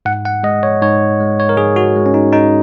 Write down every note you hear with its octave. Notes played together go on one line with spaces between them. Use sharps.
G#2 F#5
F#5
G#3 D#5
C#5
G#2 C#5
G#3
C#5
A#4
G#2 G#4
F#4
G#3
C#4
D#4
G#2 D#4